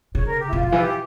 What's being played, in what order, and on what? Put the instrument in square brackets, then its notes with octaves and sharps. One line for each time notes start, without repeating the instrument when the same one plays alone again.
[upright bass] C#3 [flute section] C#5
[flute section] A#4
G4
E4
[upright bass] C#3 [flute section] F4
[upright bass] C#3 [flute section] F4
[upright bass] E3
[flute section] G4